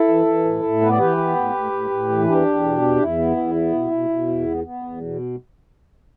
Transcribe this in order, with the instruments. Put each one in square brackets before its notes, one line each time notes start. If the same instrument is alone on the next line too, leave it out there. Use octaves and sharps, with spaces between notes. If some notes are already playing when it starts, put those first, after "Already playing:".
Already playing: [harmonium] E4 A4
E3
E3
A2
A2
B3 B4
D5
E3 G4 B4
B3
A2
A2
A2
A2
E3
E2 D4 G4
E2
B2
E2
E2 E4
B3
E2
B3
B2
B2
B2
E2
B3
B3
E2
B2